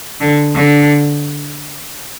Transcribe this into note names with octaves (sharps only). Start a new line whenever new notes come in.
D3
D3